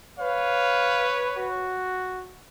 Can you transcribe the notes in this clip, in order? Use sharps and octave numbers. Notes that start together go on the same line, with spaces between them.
B4 C#5 F5
F#4